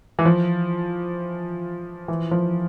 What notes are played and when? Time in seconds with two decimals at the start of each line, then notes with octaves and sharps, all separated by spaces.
0.19 E3
0.25 F3
2.08 E3
2.31 F3